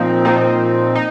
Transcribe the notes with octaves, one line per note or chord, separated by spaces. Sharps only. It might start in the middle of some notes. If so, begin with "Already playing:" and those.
Already playing: A#2 F3 C4 D#4
A#2 F3 C4 D#4
D#4